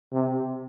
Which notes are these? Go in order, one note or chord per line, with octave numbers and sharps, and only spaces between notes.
C3